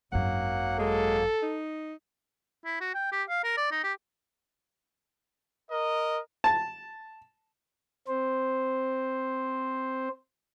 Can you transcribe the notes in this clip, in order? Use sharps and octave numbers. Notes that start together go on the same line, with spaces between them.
G#1 F#2 F#3 A#3 F#5
G#3 A4
D#4
E4
F#4
G5
G4
F5
A#4
D5
D#4
G4
A#4 D#5
A5
C4 C5